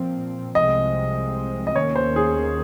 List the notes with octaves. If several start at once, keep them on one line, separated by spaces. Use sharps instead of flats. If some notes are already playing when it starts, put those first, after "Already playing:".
Already playing: A#2 F3 C4
C2 C3 F3 G#3 C4 D#5
D#5
D#2 D#3 A#3 C#4 C#5
C5
G#4